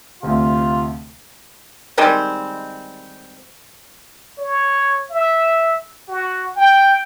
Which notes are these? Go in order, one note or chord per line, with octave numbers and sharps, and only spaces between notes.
D2 C3 F4
D#3 G3 G#3 C4
C#5
E5
F#4
G5